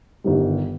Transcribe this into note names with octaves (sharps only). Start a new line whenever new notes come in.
G1 G2 D#3 G3